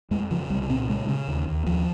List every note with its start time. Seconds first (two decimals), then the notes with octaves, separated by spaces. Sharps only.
0.11 F2 G#3
0.31 C#3 F3
0.50 C2 G3
0.69 A#2 C4
0.89 C#3 G#3
1.09 C#3
1.28 D#2
1.48 D#2
1.66 D#2 F3